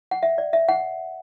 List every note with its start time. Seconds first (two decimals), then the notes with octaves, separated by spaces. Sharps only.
0.11 F#5
0.23 E5
0.38 D5
0.53 E5
0.68 F#5